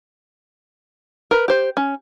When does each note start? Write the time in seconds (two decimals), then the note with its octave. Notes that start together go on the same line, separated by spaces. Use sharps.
1.31 A#4 B4
1.48 G4 C5
1.77 C#4